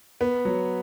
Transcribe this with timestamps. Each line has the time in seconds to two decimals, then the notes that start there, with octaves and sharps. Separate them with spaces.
0.21 B3
0.45 F#3